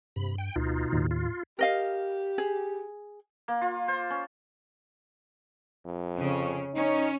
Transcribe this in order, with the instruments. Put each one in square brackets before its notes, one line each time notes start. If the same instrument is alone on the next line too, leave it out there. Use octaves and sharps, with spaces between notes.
[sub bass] G2 [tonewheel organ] C3 B5
[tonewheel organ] G5
[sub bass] D2 [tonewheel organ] B2 D#4 F4
[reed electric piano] D#2 [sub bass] A2
[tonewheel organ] F4
[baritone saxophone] G4 [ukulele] A#4 D#5 F5
[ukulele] G#4
[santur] A#3
F4
C5
C#4
[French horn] F2
[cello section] C#3 C#4
[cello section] C#4 [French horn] D#4